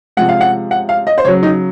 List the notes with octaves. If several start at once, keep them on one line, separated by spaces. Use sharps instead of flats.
C3 F3 G#3 F#5
F5
F#5
F#5
F5
D#5
C5
C#3 F#3 C#5
D#4